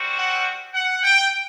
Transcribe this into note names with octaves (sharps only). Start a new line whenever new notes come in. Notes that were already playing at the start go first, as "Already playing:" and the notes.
Already playing: G3 C4 F#4
F#5
F#5
G5